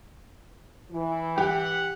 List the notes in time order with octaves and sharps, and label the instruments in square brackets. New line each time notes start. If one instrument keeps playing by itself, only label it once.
[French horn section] E3
[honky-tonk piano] G4 [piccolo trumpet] F#5